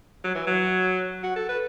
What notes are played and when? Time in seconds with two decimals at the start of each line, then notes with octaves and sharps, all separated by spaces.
0.24 F#3
0.35 E3
0.47 F#3
1.23 F#4
1.36 A4
1.49 B4